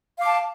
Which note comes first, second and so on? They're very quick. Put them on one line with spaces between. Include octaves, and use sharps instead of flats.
F5 D6 A5